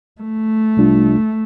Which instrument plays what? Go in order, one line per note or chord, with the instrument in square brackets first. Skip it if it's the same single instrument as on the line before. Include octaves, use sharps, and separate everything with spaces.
[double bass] A3
[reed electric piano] C2 C3 G3 D4 F4